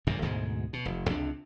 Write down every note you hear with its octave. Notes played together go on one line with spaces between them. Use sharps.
G1 F#2 A#2
D2 G#2 B2 G#3
B2
F1
C#2 C3 D4